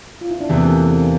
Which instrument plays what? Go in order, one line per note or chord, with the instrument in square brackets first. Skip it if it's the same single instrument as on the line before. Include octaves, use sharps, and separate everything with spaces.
[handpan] F4
E4
D4
[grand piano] E2 C3 E3 [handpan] C4
[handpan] A3
A#3
A3
A#3
C4